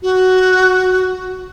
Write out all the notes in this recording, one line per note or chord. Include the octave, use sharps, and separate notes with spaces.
F#4